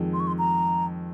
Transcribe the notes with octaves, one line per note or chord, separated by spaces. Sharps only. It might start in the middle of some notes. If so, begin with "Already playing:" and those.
Already playing: F2 D#3 G#3
C6
C#6
C6
A#5